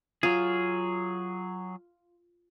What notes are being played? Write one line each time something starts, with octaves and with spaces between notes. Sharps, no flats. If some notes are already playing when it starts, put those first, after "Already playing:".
F#3 F4 G#4